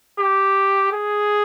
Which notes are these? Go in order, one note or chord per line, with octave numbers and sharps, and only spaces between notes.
G4
G#4